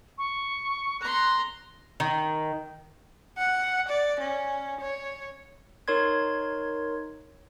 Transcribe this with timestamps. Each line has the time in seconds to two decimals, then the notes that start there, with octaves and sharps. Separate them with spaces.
0.18 C#6
1.01 A#5 C6 F#6
2.00 D#3
3.38 F#5
3.88 D5
4.20 C#4
4.81 C#5
5.88 D#4 A#4 C#5 C6 G#6